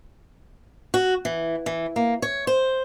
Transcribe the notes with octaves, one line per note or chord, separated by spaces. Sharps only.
F#4
E3
E3
A#3
C#5
C5